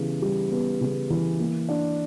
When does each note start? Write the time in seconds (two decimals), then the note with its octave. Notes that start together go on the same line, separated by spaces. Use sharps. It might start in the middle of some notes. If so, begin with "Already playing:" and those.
Already playing: C#3 E3 G3 B3
0.22 G3
0.51 B3
0.81 C#3
1.10 E3
1.40 A#3
1.69 D4